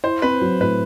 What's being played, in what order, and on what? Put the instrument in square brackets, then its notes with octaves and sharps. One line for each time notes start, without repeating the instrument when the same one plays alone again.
[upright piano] E4 [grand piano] C5
[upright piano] C4 [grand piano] B4
[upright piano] F#3
[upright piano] A2 [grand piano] B4